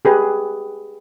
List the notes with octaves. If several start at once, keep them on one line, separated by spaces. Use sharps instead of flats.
G4 G#4 B4